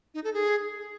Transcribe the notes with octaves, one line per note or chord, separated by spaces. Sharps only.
D#4
A4
G#4